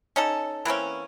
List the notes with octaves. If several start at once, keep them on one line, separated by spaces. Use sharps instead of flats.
C#4 D#4 A4
E3 A#3 C4 C#4